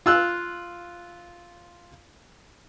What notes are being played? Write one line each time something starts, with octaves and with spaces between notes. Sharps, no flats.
F4 E6 F#6